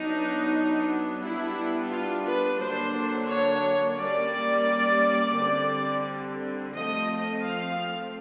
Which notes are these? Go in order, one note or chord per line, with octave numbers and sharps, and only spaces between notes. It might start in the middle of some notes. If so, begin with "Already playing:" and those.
Already playing: F#3 B3 D4 D#4
G3 B3 D4 E4
F4
B4
D3 F#3 A#3 D4 C5
C#5
G3 A#3 C#4 D5
D3 G3 C4
F3 A3 C4 D#5
F5